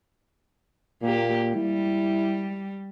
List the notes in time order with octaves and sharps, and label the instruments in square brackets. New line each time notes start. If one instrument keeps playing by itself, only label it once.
[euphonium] A#2 [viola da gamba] A#3 G4
[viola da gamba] G3 [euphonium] E4